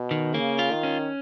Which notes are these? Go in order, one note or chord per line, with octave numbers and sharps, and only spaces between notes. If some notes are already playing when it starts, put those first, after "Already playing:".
Already playing: B2
D#3
C#3 A#3
F4
D#3
C#4